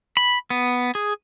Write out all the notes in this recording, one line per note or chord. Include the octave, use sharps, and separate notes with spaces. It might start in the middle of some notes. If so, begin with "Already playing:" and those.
B5
B3
G#4